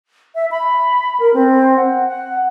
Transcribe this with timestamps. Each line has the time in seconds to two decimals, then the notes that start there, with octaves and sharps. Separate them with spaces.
0.35 E5
0.51 B5
1.20 A#4
1.34 C4
1.76 F#5
2.08 F#5